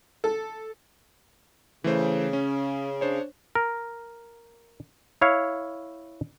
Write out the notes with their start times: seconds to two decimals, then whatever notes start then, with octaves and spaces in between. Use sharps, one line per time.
0.24 A4
1.84 C#3 E3 A3 C5
2.33 C#4
3.01 D4 C5 C#5
3.55 A#4
5.22 E4 C#5 F5